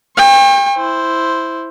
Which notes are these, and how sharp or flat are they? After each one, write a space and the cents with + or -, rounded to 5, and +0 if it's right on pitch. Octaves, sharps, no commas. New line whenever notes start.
G5 +35 C#6 -35
E4 +0 C5 +0